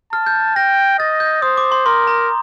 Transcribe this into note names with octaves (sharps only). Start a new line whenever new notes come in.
A5 F6
G6
G5 A#6
D#5 A6
G6
C5 D#6
D6
C6
A#4 C6
A#5